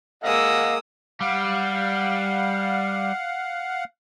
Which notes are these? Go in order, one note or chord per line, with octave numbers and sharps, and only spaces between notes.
G#3 A#3 D#5 F5 F#5 D#6 E6
G3 F5 F#5